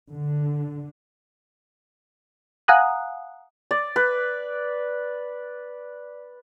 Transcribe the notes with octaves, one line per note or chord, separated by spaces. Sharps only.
D3
F5 F#5 G#5 A#5 D#6 F#6
D5
B4